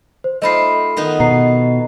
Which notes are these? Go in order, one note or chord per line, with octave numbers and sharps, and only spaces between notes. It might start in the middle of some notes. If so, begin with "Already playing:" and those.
C5
A3 D#4 F4 D#5 B5 C7
D#3 B3 D#4
B2 A#5 C7